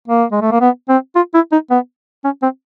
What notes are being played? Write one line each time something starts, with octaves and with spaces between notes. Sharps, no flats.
A#3
G#3
A3
A#3
B3
C4
F4
E4
D#4
B3
C#4
C4